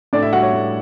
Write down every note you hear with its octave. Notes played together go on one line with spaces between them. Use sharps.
A2 D4 D5
E4 E5
G3 F#4 F#5
C#5
A2